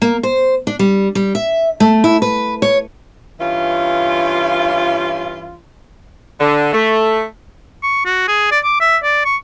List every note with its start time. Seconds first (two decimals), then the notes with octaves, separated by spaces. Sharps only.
0.02 A#3
0.23 C5
0.67 D4
0.79 G3
1.15 G3
1.35 E5
1.80 A3
2.04 E4
2.22 B4
2.62 C#5
3.40 G2 E3 C#4 F4
6.40 D3
6.73 A3
7.83 C#6
8.05 F#4
8.28 G#4
8.51 D5
8.64 D6
8.80 E5
9.03 D5
9.25 C#6